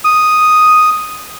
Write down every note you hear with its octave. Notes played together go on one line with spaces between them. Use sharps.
D#6